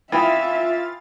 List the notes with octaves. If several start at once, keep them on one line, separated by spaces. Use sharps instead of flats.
E3 F4 E5 F5 G5 B5 D#6 A6